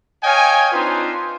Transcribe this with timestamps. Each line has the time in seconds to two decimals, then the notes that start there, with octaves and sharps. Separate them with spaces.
0.23 C#5 D#5 F5 G5 G#5
0.72 C4 D4 D#4 F4 B4 C5